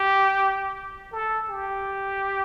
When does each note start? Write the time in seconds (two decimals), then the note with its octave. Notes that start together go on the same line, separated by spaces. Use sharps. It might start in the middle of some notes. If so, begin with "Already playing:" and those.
Already playing: G4
1.12 A4
1.50 G4